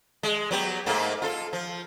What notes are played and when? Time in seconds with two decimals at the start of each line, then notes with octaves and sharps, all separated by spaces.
0.23 G#3
0.51 F#3 B3 G4
0.86 G#2 A3 A#3
1.22 F4 A4
1.53 F3